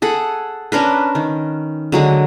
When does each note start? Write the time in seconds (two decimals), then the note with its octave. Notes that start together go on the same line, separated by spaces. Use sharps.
0.02 G#4 A4 F#5
0.72 C#4 D4 A#4 B4
1.15 D#3
1.92 D3 F#3 G#3